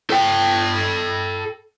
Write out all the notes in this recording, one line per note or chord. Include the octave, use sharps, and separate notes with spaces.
A4 G5